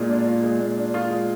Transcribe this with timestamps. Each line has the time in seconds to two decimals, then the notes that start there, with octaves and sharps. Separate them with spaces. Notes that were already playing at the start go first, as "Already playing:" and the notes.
Already playing: A#2 G#3 F4
0.09 D4
0.26 F4
0.43 G#3
0.60 A#2
0.77 D4
0.94 F4
1.11 G#3